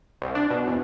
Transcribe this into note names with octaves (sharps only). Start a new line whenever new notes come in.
C2
D4
B2
E2